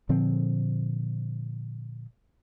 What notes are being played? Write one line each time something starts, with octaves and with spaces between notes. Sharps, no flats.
A#2 D3 F3 C4